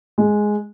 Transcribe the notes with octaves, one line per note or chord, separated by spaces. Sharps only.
G#3